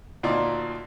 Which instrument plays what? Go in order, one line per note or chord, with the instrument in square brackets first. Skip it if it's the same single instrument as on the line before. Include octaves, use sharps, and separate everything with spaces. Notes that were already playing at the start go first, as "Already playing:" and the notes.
[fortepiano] D2 A#2 D#4 D5